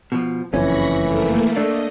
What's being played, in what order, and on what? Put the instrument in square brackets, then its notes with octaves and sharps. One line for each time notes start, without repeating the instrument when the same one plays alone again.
[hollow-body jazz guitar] B2 F3
[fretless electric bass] F#1 F2 [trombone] E3 [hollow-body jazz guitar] C#4 [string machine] B5 C#6 A#6
[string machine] A3 A#3
[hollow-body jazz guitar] A3 D4 [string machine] D#5